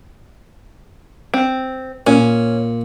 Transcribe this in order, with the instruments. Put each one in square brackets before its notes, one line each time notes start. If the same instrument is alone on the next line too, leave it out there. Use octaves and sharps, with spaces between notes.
[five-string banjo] C4
[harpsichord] A#2 [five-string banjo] C#4